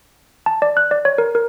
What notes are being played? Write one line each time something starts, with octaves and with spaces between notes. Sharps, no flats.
A5
D5
F#6
D5
C#5
A#4
A#4